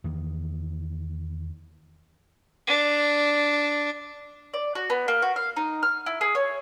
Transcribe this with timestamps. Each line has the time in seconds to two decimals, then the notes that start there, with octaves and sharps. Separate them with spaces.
0.04 E2 D#3 A#3
2.67 D4
4.54 D5
4.75 F#4
4.90 B3
5.08 A#3
5.22 F#4
5.36 F5
5.56 D#4
5.83 F6
6.06 E4
6.21 G#4
6.35 C#5